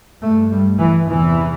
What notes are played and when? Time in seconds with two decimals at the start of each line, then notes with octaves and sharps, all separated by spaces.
0.22 G2 A3
0.50 G3
0.79 E3
1.06 E2 C3 E3